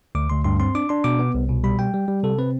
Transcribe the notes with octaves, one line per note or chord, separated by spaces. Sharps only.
D2 D6
D2 C6
G2 C6
C4 C6
D4 D6
D4 C6
B2 D6
B3
C2
B2
G3 B5
G3 G5
G3
G3
C3 A4
C4 B4